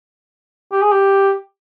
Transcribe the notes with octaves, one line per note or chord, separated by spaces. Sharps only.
G4
G#4
G4